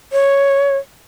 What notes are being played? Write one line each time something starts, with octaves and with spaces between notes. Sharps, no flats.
C#5